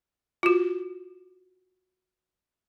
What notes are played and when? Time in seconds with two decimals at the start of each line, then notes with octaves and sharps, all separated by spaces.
0.43 F4 F#4